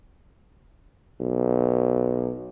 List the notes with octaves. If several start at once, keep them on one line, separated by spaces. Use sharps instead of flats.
B1